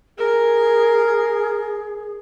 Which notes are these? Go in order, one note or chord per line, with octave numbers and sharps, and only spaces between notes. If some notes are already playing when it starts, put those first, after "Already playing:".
G#4 A#4